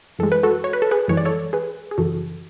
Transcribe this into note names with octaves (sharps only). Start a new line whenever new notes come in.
F#2 E3 G#3 A4
B4
F#4 A4
C#5
B4
A4
G#4 B4
F#2 E3 G#3 C#5
D5
A4 C#5
G#4 B4
G#4
F#2 C#3 E3 F#4 A4